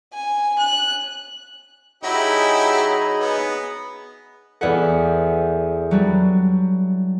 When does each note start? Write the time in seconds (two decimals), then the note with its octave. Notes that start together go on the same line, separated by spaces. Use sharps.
0.13 G#5
0.58 F#6
2.03 F#3 D#4 E4 G4 G#4 D#5 B5
3.20 B3
4.61 E2 E4 A4 D5 F#5
5.91 F#3 G3 D4